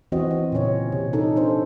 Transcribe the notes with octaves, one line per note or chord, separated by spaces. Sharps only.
E3 C4 F#4 D#5
C4
A#2 C#3 C#4 C#5
C3
C#4 D#4 A4
C4 D4 A4 C5